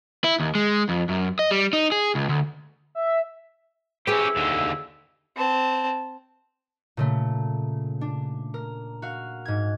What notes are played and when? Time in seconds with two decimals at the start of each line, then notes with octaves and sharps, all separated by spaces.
0.24 E4
0.40 D#2
0.55 G#3
0.89 F2
1.09 F#2
1.39 D#5
1.51 G3
1.73 D#4
1.92 G#4
2.15 C#2
2.29 D2
2.95 E5
4.07 C#4 E4 G4 G#4 B4
4.36 D#2 D3
5.36 C4 A5
6.97 A#2 C#3 A3
8.01 D4
8.54 A#4
9.02 F#4 F5
9.45 G#2 G#6